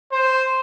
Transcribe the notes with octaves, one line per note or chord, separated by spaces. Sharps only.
C5